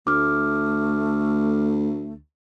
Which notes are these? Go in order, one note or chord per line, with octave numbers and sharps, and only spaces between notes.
D2 A3 D6 F6